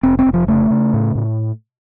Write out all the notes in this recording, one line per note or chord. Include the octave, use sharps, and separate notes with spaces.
F1 C4
C4
F1
F3
C#3 A3
C#3
A2
A2